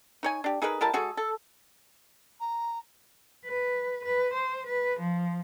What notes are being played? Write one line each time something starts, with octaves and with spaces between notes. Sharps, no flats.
D#4 C#5 G#5
D4 G4
D#4 G#4 A#4 B4
G3 E4 A#4 A5
G#3 F#4 G#4 A4
A4
A#5
B4
B4
C5
B4
F3